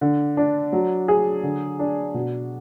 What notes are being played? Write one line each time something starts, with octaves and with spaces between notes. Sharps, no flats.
D3
D4
F#3
G#4
D3
D4
B2